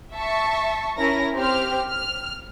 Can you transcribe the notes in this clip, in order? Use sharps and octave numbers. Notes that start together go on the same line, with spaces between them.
E5 A5 C#6
C#4 E4 A#4 A#6
C4 G4 C5 F6
F6